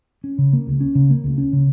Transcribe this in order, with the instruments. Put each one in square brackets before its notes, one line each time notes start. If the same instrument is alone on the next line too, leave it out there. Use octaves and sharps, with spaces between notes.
[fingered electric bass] C#4
C#3
A#3
C#2
C#4
C#3
A#3
C#2
C#4
C#3